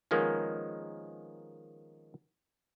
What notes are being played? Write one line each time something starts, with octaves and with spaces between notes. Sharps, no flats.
D#3 F3 G#3 A#3 B3 C#4